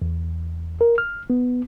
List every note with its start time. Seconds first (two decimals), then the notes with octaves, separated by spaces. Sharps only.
0.02 E2
0.81 A#4
0.98 F6
1.30 B3